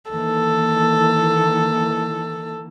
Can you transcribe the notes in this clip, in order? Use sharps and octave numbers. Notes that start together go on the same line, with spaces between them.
D#3 E3 A#3 A4